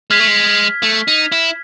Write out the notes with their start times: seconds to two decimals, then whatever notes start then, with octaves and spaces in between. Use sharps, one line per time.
0.10 G#3 F6 G#6 B6
0.20 A3
0.28 G#3
0.83 A3
1.08 D#4
1.32 E4